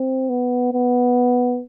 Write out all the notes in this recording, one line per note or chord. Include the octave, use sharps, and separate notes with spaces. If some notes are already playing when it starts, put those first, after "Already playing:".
Already playing: C4
B3
B3